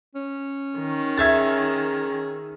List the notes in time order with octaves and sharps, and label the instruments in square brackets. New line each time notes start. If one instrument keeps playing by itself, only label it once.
[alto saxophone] C#4
[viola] D#3
[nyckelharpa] G#4 [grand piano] E5 G#6 A6